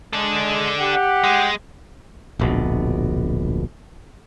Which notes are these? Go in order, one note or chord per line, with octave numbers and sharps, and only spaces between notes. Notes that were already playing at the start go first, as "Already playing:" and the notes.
G#3 D4 A4
G4 F#5
G#3
D1 A#1 B2